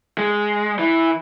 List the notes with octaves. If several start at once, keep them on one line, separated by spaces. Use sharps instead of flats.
G#3
E3